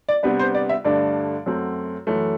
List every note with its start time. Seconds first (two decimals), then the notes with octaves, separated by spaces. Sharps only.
0.09 D5
0.23 C3 G3 B3 D4 B4
0.39 C5
0.55 D5
0.69 E5
0.85 G2 D3 A3 D4 D5
1.46 F#2 F#3 A3 C4
2.07 F#2 E3 A3